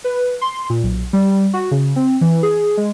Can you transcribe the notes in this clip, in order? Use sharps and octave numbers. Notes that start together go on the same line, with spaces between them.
B4
C6
A#2
B1
G3
F#4
C#3
C4
E3
G#4
G#3